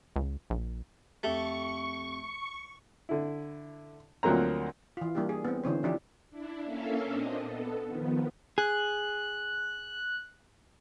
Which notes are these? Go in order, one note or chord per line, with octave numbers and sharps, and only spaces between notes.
C#2
A#1
F2 A3 G4 C#6
D3 E4
D2 F3 F#3 A#3 C4 A#5
E3 F4
G3 A#3 D4 E4 G4
G#4
B3 C4
D3 E3 C#4 C5
F3 D4 E4 G4
D4 E4
A#3 C#4 A4 E5 F5
A#2 C4 D4 D#5
B3 A4
D#3 F3 B3
G#4 F#6